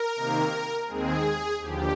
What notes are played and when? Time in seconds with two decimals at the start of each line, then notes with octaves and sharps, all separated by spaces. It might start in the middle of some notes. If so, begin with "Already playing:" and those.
Already playing: A#4
0.16 C3 D#3 A#3
0.88 D#2 D#3 G#3 C4 G#4
1.60 D#2 D3 F3 G4